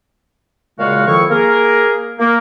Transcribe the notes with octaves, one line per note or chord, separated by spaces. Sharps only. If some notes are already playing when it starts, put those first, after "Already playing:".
A#2 C#3 G#3 F#4 C#5 F5
F2 D#3 F3 E4 C#6
A#3 G#4 A#4
A#3